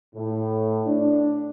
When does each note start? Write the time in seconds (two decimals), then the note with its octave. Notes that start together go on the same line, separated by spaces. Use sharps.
0.15 A2
0.86 D4